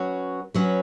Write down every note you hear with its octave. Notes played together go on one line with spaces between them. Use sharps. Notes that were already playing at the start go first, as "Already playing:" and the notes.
Already playing: F#3 C#4 F#4 B4
F#3 C#4 F#4 B4